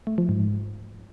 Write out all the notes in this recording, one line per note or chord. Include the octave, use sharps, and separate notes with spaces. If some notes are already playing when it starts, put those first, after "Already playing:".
A3
F3
G#2
G#2